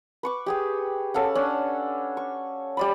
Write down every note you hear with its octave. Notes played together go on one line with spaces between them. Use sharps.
B4 C#6 D6
G4 G#4 G5
C#4 A4 F5 F#5
C#4 D4
C#6
G3 D5 B5